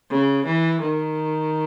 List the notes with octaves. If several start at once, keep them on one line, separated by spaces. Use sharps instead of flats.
C#3
E3
D#3